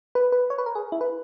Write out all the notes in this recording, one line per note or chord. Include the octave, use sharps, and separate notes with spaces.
B4
B4
C#5
B4
A#4
G#4
E4
B4